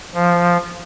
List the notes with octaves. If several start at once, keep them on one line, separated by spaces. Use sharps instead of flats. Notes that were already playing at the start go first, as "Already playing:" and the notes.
F3